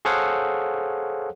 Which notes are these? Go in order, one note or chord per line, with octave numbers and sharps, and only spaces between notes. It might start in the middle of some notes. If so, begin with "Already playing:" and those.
G#4 A4 C5 C#5 F5 F#5